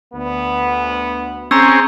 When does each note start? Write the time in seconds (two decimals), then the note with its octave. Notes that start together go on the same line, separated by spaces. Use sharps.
0.13 D2 B3
1.51 C4 C#4 G#4 A#5 E6